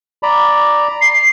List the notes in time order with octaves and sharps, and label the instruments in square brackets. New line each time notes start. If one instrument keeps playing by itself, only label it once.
[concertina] D5 A#5 B5
[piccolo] C7